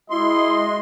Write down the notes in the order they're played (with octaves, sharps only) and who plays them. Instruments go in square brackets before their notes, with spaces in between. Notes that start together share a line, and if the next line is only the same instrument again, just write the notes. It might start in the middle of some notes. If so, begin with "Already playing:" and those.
[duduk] G#3 [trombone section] E4 F#4 [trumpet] D#5 [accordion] C6